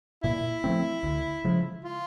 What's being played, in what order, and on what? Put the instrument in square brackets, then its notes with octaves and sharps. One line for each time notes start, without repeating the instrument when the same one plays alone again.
[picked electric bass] A#2 [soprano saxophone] E4
[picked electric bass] F3 A3 C4
D2
C#3 F3 G#3
[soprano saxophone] F4